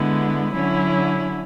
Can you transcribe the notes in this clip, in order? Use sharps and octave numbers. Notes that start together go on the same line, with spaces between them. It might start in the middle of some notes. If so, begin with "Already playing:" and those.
Already playing: D3 G#3 B3 E4
D3 F#3 C#4 E4